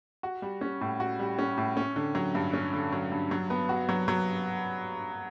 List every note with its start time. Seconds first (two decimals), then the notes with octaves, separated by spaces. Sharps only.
0.23 F#4
0.42 G3
0.61 C#4
0.81 A2
1.00 F#4
1.19 G3
1.39 C#4
1.58 A2
1.77 C#4
1.96 D3
2.15 F#3
2.35 G2
2.53 C#4
2.73 D3
2.92 F#3
3.12 G2
3.31 F#3
3.50 B3
3.69 F#4
3.89 F#3
4.08 F#3